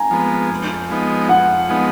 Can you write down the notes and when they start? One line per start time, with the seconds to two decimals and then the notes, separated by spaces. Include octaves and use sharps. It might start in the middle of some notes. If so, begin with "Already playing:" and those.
Already playing: G#5 A#5
0.11 F3 G#3 B3
0.51 F2
0.90 F3 G#3 B3 D#4
1.29 F2 F#5
1.69 F3 G#3 B3 D#4